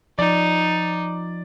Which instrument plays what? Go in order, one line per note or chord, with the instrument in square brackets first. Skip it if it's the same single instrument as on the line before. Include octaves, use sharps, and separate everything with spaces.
[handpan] F3 [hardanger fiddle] D#4 [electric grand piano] D5